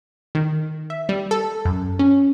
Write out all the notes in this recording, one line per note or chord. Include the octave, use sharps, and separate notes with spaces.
D#3
E5
G3
A4
F#2
C#4